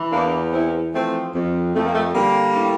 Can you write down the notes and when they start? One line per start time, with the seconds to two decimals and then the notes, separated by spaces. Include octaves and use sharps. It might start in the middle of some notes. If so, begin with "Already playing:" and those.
Already playing: E3
0.11 E2 A#3 D4
0.52 E3 C4 E4
0.93 F3 A3 C4
1.34 F2
1.74 F2 A3
1.85 A#3
1.94 A3
2.15 D3 G3 A#3
2.56 A2